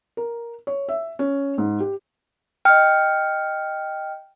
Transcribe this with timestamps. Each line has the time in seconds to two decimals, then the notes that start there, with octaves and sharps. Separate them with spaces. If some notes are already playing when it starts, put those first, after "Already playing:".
0.17 A#4
0.67 C#5
0.89 E5
1.19 C#4
1.58 G#2
1.80 G4
2.65 D#5 G5 F6